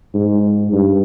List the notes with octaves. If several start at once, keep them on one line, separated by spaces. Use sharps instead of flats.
G#2
G2